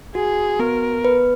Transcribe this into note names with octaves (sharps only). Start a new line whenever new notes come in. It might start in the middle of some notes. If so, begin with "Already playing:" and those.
F#4 G#4
B3 A#4
B4